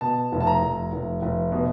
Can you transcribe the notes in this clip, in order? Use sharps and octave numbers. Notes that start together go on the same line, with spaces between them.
B2 A5
F1
A5
A#5
F1
F1
F1
B2